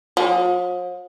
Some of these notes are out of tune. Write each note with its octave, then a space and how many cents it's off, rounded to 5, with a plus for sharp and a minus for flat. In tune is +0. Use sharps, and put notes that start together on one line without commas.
F3 +45